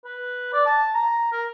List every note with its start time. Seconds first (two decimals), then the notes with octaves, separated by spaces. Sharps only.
0.05 B4
0.53 D5
0.67 A5
0.95 A#5
1.32 A#4